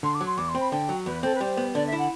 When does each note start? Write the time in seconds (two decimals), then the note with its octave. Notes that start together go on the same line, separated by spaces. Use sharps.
0.03 D3 C6
0.15 D6
0.21 F#3
0.26 C6
0.37 E2 D6
0.49 C6
0.55 C4
0.60 B5
0.72 D3 G5
0.89 F#3
1.06 E2 B4
1.23 C4 A4
1.35 B4
1.40 G3 C5
1.57 B3
1.75 D3 D5
1.87 E5
1.92 E4
1.98 F#5